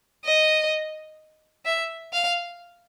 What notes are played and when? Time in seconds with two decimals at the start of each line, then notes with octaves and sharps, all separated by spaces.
0.25 D#5
1.66 E5
2.13 F5